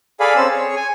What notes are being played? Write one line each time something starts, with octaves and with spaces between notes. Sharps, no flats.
G#4 A4 D5 F5 G#5 B5
C4 C#4 E6
G#4 C#5
G#5